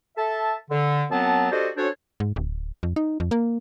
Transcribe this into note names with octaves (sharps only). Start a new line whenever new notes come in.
A4 E5 A5
D3
F#2 F#3 B3 C4 A5
D4 F#4 G4 A4 C5 D#5
C#4 D4 F#4 A4 C5 C#5
G#2
D1
F2
D#4
F2
A#3